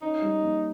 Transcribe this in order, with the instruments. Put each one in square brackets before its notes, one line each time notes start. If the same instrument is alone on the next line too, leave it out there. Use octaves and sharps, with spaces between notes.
[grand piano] C#4 [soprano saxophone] D#4
[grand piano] G3
A#3